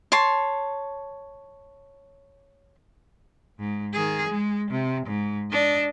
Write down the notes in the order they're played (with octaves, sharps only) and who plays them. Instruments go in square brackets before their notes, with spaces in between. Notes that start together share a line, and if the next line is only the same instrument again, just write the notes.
[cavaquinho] C#5 A5 C6
[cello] G#2
D#3 G#4
G#3
C3
G#2
D4 D#5